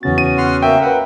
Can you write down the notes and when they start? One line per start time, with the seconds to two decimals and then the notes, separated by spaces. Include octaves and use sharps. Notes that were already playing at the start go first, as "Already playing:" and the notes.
0.03 E2 C#3 B3 C#4 F#4 A6
0.18 D#7
0.38 F#5 C6 F6
0.63 A#3 E5 G5
0.82 A#4 B4 F#5